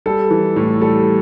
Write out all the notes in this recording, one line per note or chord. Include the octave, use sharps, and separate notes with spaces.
G3 A4
E3
A2
G3 A4